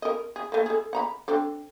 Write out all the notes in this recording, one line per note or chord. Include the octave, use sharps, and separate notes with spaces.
A#4 D#5
G#4
A3 A#3
G#4 A4
F#5 A#5 B5
C4 D4 A4